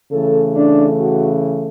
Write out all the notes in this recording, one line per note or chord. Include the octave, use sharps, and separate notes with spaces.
C#3 E3 A3 A4
D4
F#4